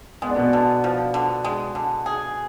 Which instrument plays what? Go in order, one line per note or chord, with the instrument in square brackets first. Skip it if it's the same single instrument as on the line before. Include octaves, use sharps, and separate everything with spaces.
[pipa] G#3 [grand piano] B3
[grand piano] D4
B2 B3
[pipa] D3
F3
D3
G#3
D3
G#4